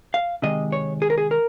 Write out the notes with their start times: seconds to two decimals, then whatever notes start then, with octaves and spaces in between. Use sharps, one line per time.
0.14 F5
0.42 C3 D#3 G#3 D#5
0.72 C#5
1.02 G#4
1.10 A#4
1.18 G#4
1.31 A#4